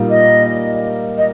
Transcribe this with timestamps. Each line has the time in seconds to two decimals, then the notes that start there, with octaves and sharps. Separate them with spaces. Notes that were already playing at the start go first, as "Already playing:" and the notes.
Already playing: A#2 G3 A#3 D#4
0.10 D#5
1.18 D#5